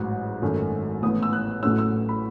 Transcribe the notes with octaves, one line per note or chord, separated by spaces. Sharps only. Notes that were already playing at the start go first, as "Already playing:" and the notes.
Already playing: A1 G#2 F#3
G#1 F#2 D#3 A3
A1 A2 E3 B3 D#6
E6
F#6
A1 A2 F#3 A3 C#4 E6
E6
B5